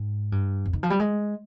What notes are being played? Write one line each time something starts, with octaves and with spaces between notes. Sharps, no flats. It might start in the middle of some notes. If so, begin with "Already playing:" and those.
Already playing: G#2
G2
F2
D#3
F3
G3
G#3